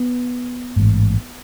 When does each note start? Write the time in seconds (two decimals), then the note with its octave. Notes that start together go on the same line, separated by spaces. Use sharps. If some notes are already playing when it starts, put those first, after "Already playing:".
Already playing: B3
0.76 A1 G#2